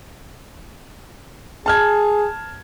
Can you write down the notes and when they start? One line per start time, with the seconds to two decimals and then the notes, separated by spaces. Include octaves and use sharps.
1.66 G#4 A5 F6 G#6